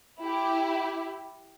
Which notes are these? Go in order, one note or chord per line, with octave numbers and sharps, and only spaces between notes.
E4 G4